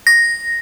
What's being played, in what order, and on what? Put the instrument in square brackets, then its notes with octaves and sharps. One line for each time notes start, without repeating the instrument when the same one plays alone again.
[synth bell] A#6